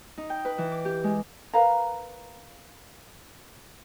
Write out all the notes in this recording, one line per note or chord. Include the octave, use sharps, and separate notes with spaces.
D#4
G5
B4
E3
D6
G4
G#3
A#4 B4 F5 A#5